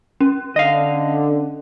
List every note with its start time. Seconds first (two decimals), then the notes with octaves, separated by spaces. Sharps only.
0.20 C#4
0.56 D3 D#5 F5